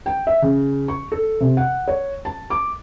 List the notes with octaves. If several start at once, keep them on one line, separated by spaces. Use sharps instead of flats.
G5
E5
C#3
C#6
A4
C3
F#5
C#5
A5
D6